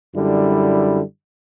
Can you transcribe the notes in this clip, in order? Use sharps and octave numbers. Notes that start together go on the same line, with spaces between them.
F#2 D3 G3 E4